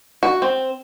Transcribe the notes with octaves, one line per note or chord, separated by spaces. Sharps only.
F#4
C4